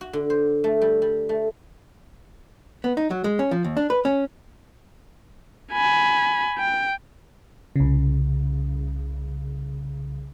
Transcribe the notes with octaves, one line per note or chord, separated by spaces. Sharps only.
F#4
D3
C5
A3
G3
G3
A3
B3
D#4
F#3
G#3
C#4
F3
D#2
D4
B4
C#4
G#5 B5
G5
C2 C#3